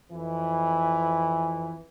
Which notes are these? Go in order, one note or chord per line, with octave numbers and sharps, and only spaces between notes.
F2 E3